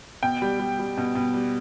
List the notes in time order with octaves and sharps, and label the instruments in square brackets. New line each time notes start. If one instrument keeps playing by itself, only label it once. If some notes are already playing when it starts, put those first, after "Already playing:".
[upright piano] B2 G5
G3
G3
G3
B2
B2
G3